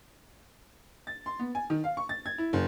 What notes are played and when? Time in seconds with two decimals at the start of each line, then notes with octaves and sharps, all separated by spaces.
1.07 A6
1.26 C6
1.39 B3
1.55 G#5
1.70 D#3
1.84 F5
1.97 C#6
2.09 A6
2.26 G#6
2.38 E4
2.53 F#1